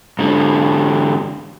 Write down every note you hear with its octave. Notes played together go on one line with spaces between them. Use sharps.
G#2 D3